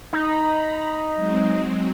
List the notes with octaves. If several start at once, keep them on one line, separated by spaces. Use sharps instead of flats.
D#4 A#5 B5
F#3 G#3 C4